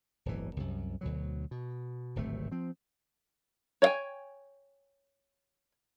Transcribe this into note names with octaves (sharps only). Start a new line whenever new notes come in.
D1 G1 E3
C2 F#2
D2 B2 F#3
B2
D1 G#1 C3 A3
F3 C4
C#5 D5 F5 G5 G#5